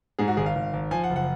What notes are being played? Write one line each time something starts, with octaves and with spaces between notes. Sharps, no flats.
G#2 G#4
F#4
G#1 G#4
F5
G#1
G#1
F3 G#5
F#5
F#1
F#5